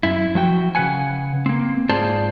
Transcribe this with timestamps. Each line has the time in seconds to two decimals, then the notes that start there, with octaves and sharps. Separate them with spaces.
0.03 F#2 E4
0.35 F3 F#4 G5
0.75 C#3 C4 B4 F#5 G#5
1.46 A#3 C4
1.89 G#2 F4 G#4 C5 D5 A5